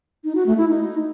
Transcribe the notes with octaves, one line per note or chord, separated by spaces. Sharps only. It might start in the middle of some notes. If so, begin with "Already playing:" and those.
D#4
F#4
A3
E4
D#4